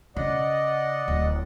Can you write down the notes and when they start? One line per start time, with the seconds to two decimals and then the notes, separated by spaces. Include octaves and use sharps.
0.16 C#3 D5 D#5 F#5
1.08 D1